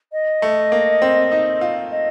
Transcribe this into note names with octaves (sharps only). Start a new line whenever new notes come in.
D#5
A3
A#3
C4
D#4
F4
D#5